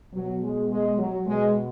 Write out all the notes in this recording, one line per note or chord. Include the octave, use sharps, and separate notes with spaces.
B2 F#3
G#3
G#3
F#3
B2 G#3